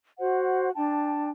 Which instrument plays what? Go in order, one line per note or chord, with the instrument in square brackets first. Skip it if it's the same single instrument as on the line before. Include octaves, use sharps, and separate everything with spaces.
[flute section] F#4 C5 F#5
D4 G5 A5